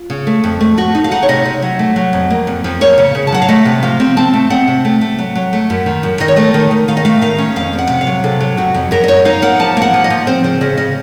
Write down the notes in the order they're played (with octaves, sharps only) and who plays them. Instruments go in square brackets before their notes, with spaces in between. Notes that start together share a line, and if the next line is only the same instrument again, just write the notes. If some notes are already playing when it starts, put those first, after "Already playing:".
Already playing: [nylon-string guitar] F4
C#3
A3
F2
A3
A3 F#4
D#4
F5
D#4 F#5
C#5
C3 D#5
C3
F#3
A3
F#3
F2
A#3
F2
F2
A#3 C#5
C#3
C#3
A5
F#3 F#5
F5
A3 D#5
C3
F3 F5
C4
C4 A5
A3
C4 F#5
C3
A3
A3
F#3
F#3
A3
F#2
D#3
F#2
D#3 D#5
C#5
A3 D#5
D#3
D#3
D#3 F5
D#5
A3 F5
D#3 F5
C#4
F2 F5
C4
F#5
C3
F5
F#3
C3 A4
F#3
F2 F#4
F2
F#2 A#4
D#5
D#4 C#5
D#4 F5
A#3 F#5
F3 A5
A#3 F#5
F3
D#5
F3
C4 C5
C#3 C5
C#3 D#5
C#3 D#5